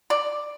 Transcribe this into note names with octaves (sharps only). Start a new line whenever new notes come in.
D5